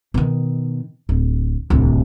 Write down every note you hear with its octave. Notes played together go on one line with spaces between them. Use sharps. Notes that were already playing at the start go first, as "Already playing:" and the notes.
B2 D#3
D1
D1 C2